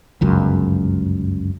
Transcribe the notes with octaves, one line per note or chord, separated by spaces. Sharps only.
G1 C#2 F#2